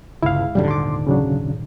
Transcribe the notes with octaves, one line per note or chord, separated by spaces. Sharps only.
G1 C#2 E4 F5
D#1 F2 G#2 D3 F#3 G3
C6 D6
C#3 F#3 D4